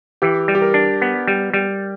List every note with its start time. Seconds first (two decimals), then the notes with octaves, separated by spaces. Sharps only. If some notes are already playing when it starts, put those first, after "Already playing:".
0.22 E3 G4
0.48 G3
0.55 G4
0.62 A#4
0.74 D4
1.02 B3
1.27 G3
1.53 G3